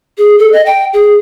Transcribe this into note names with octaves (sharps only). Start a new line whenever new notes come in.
G#4
A4
D#5
G5
G#4